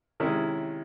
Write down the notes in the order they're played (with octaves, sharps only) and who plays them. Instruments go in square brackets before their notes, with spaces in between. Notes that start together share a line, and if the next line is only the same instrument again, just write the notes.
[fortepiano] C3 D#3 G#3 C#4 E4